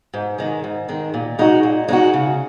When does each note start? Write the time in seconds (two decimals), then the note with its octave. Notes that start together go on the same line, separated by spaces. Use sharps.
0.14 G#2
0.38 D#3 G#3
0.64 G#2
0.89 D#3 G#3
1.14 A#2
1.39 G#3 D#4 F#4
1.63 A#2
1.88 G#3 D#4 F#4
2.13 C#3